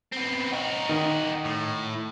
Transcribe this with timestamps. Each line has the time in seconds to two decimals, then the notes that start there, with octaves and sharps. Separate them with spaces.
0.12 B3 C4
0.53 D#4 F#4
0.89 D#3
1.44 A2